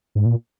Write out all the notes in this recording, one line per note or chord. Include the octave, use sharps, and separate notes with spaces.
G#2
A#2